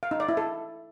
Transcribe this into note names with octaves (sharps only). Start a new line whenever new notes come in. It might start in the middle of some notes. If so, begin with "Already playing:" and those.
F5
D#4
D5
E4
A4